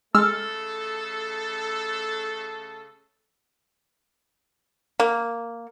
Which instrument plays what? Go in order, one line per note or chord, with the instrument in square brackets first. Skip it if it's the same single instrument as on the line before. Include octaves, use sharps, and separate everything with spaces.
[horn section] C#3 A3 A4 [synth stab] G#3 E6 F6
[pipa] A#3